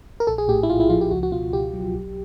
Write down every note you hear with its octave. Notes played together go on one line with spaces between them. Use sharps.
A#4
A#1 A4
G#4
A2 G4
E4
A#1 F4
E4
F3 F4
G4
C#2 F#4
F#4
B2 F4
C#2 G4
F#3
B1